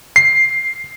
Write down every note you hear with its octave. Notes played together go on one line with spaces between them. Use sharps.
C7